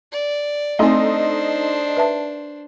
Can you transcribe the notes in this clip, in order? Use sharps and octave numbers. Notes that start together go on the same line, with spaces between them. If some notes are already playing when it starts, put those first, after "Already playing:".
D5
A3 C4 D4 D#4 A4 C5 C6
B4 E5 A5